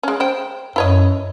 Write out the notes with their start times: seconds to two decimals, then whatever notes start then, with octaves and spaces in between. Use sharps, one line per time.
0.03 G#3 C#4
0.20 C5 G5
0.76 F#2 E4 C#5 D#5